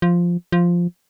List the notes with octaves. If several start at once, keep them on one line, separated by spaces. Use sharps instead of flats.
F3
F3